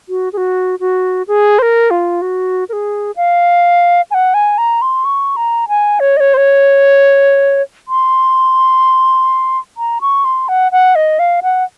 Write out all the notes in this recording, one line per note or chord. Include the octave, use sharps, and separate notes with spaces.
F#4
G#4
F#4
F#4
G#4
C5
A#4
F4
F#4
A#4
G#4
F5
G#5
F#5
G#5
A#5
C6
C#6
A#5
G#5
C#5
D#5
C#5
C5
C#5
C6
A#5
C#6
C6
F#5
F#5
D#5
F5
F#5